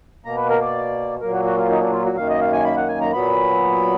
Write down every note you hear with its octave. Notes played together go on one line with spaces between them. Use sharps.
B2 A#3 A#5
B4
A#4
D5
A#2 F#3 A#3 A#4
F#4
F#4
F4
D#4
D4
F4
F#4
F#2 D#3 A#3 F5
D#5
F5
G#5
B5
F#5
G#5
A#5
A#2 F#3 B3 B5